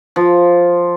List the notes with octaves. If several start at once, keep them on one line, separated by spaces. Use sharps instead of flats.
F3